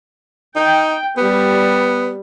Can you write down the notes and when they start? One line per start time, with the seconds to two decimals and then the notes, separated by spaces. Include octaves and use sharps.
0.56 D#4 G5
1.18 G3 B3